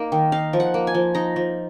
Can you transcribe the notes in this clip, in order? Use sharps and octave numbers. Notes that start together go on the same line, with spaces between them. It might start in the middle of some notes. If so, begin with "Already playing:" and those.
Already playing: A#3 D#4
D#3
D#4 F5
F3
F#5
A#3
G#5
F3
D#4 A#5
F3